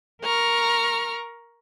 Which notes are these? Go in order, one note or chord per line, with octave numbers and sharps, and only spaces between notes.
A#4 A#5 C#6 F6